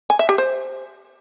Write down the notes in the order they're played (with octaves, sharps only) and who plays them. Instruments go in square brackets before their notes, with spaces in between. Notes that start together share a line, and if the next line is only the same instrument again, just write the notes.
[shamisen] G#5
E5
G4
C5